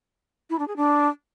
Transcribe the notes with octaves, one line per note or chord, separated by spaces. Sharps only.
E4
D4
G#4
D4